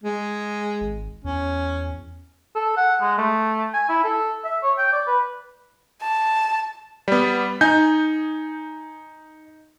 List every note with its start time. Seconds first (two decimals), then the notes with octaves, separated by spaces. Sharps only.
0.03 G#3
0.81 G#1
1.24 E2 C#4
2.55 A4
2.77 F#5
3.01 G#3
3.18 A3
3.74 G#5
3.89 E4
4.04 A4
4.44 E5
4.63 C#5
4.78 G5
4.92 D5
5.07 B4
6.01 A5
7.08 G3 B3
7.61 D#4 G#5 G6